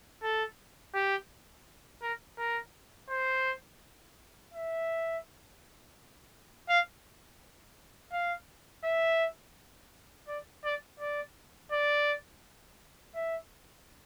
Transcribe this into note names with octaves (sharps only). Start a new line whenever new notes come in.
A4
G4
A#4
A#4
C5
E5
F5
F5
E5
D5
D5
D5
D5
E5